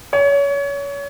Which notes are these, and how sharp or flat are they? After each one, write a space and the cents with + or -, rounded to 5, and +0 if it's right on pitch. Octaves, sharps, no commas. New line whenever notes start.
C#5 +30